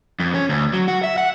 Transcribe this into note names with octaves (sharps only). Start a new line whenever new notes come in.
F2
C#4
D2
F#3
F#4
E5
F#5